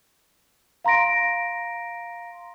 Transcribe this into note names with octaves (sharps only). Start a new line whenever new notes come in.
F5 A#5 C6 A#6 D7